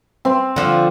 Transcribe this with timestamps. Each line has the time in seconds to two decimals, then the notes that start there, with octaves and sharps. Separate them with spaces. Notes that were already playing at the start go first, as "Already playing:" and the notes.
0.25 C4
0.56 D3 F3